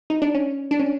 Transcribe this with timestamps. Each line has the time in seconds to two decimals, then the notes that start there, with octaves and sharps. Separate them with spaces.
0.10 D#4
0.22 D4
0.35 C#4
0.71 D4
0.80 C#4